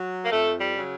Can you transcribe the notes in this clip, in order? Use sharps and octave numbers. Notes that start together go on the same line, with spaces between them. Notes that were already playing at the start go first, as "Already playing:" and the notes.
Already playing: F#3
A#3
F2 A3
G3
C#3 F#3